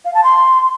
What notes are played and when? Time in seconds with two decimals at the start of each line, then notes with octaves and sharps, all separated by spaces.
0.05 F5
0.14 A5
0.24 C6